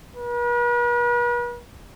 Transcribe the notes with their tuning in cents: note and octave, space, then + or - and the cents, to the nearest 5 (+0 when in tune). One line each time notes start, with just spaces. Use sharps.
B4 -45